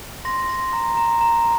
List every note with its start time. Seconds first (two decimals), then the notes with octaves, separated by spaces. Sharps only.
0.25 C6 A#6
0.49 C6 A#6
0.73 A#5
0.97 A#5
1.21 A#5